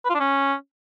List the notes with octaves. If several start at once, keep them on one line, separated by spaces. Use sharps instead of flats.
B4
F4
D4
C#4